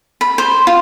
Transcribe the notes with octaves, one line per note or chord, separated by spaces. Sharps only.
B5
C5
F4